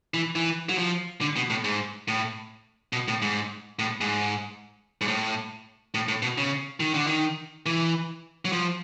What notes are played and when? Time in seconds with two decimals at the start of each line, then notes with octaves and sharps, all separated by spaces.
0.14 E3
0.35 E3
0.69 F#3
0.78 F3
1.21 D3
1.36 B2
1.50 A2
1.64 G#2
2.08 A2
2.93 B2
3.08 A2
3.22 G#2
3.79 A2
4.01 G#2
5.01 G#2
5.08 A2
5.94 A2
6.08 A2
6.22 B2
6.38 C#3
6.80 D#3
6.94 D3
7.07 D#3
7.66 E3
8.45 F#3
8.52 F3